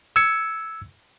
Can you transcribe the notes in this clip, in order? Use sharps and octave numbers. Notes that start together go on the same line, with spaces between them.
E6 G#6 C#7